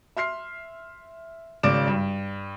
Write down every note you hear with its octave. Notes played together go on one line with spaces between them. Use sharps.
E5 C6 F6 C7
G#1 C#3 D5 D6 D7 E7
G2